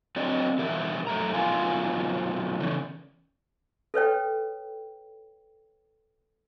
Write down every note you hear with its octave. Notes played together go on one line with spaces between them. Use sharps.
F#3 C4 D5 D#5
B2 E3 G4 A#4 E5
F#2 A3 A#4 A#5
F#2 B2 D#3 F4 F5 G#5
C#3 E3
A4 B4 C#5 G5